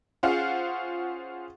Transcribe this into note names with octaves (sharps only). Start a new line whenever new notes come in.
C#4 F4 G#4 C5 F5 F#5